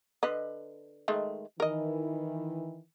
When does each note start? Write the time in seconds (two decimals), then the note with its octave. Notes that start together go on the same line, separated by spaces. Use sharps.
0.23 D3 B4 D#5
1.08 D#3 G#3 A3
1.60 D#3 E3 A#4 D#5